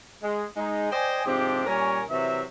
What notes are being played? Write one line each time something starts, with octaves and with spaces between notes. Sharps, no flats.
G#3
G#3 D#4
C5 D5 D#5 G5 G#5
G#2 C3 F3 C4 D4 G4
A#2 G3 C#4 A#4 C#5 G#5
C3 E3 F#3 E5